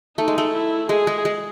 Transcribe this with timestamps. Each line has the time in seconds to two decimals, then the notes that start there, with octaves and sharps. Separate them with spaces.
0.17 A3 D#4
0.28 G#3
0.38 A3
0.53 E4
0.89 G#3 G#4
1.07 G#3
1.25 G#3